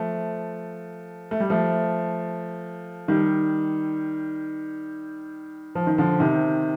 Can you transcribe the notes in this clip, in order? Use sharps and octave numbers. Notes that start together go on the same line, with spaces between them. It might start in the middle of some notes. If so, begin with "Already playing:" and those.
Already playing: F3 A3
A3
G3
F3 A3
D#3 G3
F3
D#3
D3 F3
C3 D#3